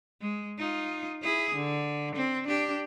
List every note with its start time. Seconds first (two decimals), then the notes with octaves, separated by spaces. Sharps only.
0.21 G#3
0.58 D#4 F4
1.22 E4 G#4
1.55 D3
2.15 C4
2.48 D4 G4